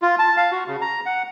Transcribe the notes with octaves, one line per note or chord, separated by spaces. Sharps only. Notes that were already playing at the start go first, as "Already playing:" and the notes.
F4
A5
F5
F#4
C#3
A#5
F#5